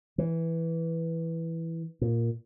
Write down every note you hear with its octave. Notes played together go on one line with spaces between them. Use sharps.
E3
A#2